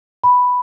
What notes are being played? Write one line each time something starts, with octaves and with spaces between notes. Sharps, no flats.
B5